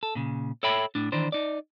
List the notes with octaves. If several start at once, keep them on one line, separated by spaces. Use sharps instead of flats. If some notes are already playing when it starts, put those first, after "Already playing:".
A4
A#2 C#3
A4 C#5 E5 G5 B5
A2 D4
D#3 E3 D4 C5
D#4 D5